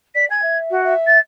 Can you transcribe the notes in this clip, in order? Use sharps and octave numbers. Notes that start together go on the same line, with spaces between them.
D5 B6
G#5 G#6
E5
F#4
E5
A6